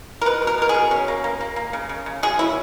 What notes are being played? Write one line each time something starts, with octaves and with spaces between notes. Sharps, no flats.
A#4
B2 B4
B2
A#4
B2 A#4
G#4
B2
C#4
A#3
A#3
A#3
A#3
C#3
C#3
C#3
F#3 G#4
C#4 E4